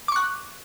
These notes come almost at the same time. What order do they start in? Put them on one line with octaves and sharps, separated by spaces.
D6 C#6 F#6